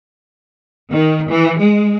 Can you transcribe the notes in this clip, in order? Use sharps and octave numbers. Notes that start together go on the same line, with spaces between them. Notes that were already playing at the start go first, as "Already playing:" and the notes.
D#3
E3
G#3